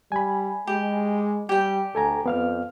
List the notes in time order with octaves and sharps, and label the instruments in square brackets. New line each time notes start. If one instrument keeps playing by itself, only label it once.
[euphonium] G3 [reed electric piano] G#5 B5
[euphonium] G#3 [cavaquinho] G4
[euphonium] G3 [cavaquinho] G4 G5
[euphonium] D2 [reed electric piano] A4 G#5 A#5
[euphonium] F2 [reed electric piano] B3 F5 F6